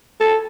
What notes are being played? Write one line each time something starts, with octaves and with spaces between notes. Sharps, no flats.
A4